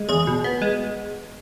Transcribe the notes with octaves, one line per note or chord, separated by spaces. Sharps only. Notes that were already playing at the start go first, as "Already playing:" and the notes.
Already playing: G#3
E2 G#4
B2
B3
G#3